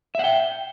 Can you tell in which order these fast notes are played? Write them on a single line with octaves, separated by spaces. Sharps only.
E5 F#5 G5